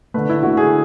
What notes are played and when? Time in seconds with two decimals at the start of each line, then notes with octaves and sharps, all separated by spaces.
0.14 D3 A3 B4
0.29 E4
0.43 D3 A3 F#4
0.57 G#4